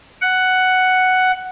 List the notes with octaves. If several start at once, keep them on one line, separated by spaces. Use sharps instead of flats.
F#5